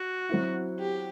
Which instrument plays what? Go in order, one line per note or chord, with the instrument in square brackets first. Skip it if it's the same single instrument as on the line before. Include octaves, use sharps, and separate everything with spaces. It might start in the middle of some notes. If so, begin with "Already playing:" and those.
Already playing: [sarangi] F#4
[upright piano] F#3 C4 E4
[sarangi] G4